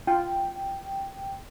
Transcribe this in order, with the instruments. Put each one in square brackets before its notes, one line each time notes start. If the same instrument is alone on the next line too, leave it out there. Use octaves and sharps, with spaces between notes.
[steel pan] F4 [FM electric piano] G5